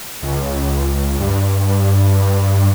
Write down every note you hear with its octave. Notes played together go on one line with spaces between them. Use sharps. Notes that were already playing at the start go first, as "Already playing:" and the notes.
C#2
G2